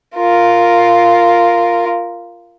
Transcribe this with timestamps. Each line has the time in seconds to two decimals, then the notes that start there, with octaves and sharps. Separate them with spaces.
0.16 F4 A#4